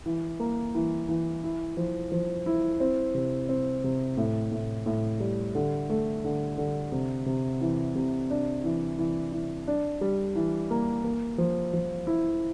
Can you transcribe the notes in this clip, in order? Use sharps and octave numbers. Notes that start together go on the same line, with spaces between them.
E3
A#3
E3
E3
E4
F3
F3
E4
C4
C3
C4
C3
A2
A2
A2
G3
D3
A3
D3
D3
C3
C3
E3
C3
D4
E3
E3
E3
D4
G3
E3
A#3
A#3
F3
F3
E4